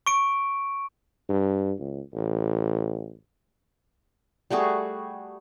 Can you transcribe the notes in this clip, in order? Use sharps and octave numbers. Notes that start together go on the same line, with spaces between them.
C#6 D7
G2
C#2
A1
G3 A3 F#4 G#4